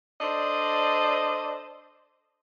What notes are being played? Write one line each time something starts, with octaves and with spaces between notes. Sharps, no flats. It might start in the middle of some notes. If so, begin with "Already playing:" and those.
D4 A4 C5 D5 D#5